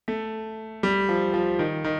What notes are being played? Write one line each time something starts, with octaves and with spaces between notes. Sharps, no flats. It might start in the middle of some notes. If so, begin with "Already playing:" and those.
A3
G3
F3
F3
D#3
D#3